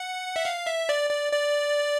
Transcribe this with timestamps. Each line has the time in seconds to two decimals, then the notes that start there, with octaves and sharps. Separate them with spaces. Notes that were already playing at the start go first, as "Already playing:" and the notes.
Already playing: F#5
0.36 E5
0.45 F5
0.67 E5
0.89 D5
1.10 D5
1.33 D5